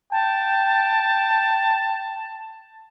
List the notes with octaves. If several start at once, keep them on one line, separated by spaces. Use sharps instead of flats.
G5 A5